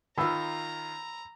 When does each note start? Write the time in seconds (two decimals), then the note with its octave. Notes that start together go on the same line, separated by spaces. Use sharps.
0.18 D#3 F4 A#5 B5 E6